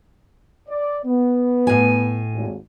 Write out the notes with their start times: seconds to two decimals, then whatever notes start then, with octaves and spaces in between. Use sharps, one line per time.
0.68 D5
1.04 B3
1.67 A2 G#5
2.35 G#1 D#2